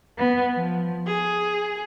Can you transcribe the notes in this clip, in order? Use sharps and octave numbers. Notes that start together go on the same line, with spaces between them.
B3
F3
G#4